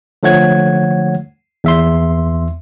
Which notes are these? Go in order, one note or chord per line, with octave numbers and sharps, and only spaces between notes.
D3 F3 A3 C#5 F#5 G#6
E2 E5 C6